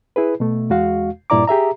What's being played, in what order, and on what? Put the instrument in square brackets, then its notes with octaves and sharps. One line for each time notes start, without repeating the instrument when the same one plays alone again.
[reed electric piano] E4 G#4 B4
B2 A3
E2 G#3 F#4 F5
G2 A#2 E4 D5 A#5 D6
G4 G#4 E5 A#5